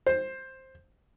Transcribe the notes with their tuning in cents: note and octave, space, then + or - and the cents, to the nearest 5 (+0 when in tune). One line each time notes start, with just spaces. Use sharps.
C5 +10